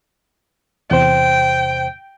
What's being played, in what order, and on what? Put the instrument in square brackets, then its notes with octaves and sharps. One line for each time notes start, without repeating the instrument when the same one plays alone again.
[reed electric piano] E2 C3 C5 [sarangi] G5